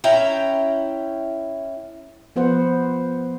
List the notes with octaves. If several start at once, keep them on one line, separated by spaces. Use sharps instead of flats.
C#4 E4 G5 A#5
F3 B3 C5 F#5